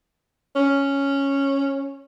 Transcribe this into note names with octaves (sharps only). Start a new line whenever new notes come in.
C#4